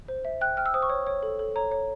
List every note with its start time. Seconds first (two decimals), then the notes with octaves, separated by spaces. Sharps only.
0.08 C5
0.25 E5
0.41 G5 F#6
0.57 G5 F6
0.66 E6
0.74 C5 D#6
0.83 C#6
0.90 C#5
1.07 C#5
1.23 A4
1.39 A4
1.56 C#5 A#5
1.71 C#5